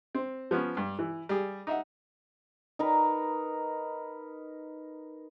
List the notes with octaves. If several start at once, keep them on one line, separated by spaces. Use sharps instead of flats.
C4
F3 B3 C#4
G2
E3
G3 G#4
D#4 E5 F#5
D#4 A#4 B4